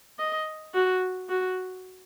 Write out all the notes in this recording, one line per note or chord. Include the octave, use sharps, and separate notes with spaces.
D#5
F#4
F#4